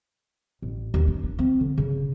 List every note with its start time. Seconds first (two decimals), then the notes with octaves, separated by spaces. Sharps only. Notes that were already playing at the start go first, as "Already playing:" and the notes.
0.62 A1
0.94 D#2
1.08 D4
1.24 D4
1.39 C4
1.61 D3
1.78 C#3